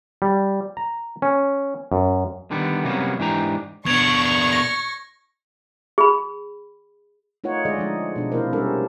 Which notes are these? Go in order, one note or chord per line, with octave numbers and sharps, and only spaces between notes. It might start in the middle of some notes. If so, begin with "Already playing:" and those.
G3
A#5
C#4
F#2
D3 D#3 G3 B3
C3 F#3 G3 A#3 B3 C#4
G#2 E3 D4 G4 A#5
B2 D4 C#6 G#6 F7
A#6
G#4 B5
A3 D#4 F4 C#5 F#5
D3 G#3 G#4 D5 D#5
F3 G#3 D#4
B2 D4
C3 A3 A#3 E4 A#4 C5
G3 C#4 D4 A4 A#4